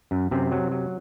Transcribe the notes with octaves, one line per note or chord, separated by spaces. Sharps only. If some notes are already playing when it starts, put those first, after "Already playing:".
F#2
F#2 C3 C4
F#3
F#3